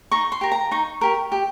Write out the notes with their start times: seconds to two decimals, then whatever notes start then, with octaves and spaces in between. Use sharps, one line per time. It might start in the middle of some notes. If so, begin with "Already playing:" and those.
0.11 D#4 C#6
0.32 C6
0.41 G4 A#4
0.52 A#5
0.71 D#4 C#6
1.01 G4 A#4
1.32 G4